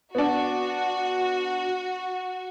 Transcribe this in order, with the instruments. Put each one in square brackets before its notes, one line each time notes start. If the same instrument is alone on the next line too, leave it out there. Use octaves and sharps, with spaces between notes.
[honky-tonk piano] B3 D4 [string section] F#4